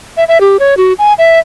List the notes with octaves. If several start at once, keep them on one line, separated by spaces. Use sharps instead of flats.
E5
E5
G4
C#5
F#4
G#5
E5